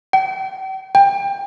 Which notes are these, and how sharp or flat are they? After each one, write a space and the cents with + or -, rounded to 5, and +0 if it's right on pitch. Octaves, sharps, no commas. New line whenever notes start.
G5 -40
G5 +20